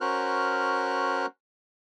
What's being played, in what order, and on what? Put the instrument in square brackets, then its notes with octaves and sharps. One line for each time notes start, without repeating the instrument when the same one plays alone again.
[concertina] C#4 F#4 A#4 C5 F6 F#6